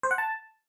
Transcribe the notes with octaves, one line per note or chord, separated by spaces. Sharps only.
C5
F#5
A5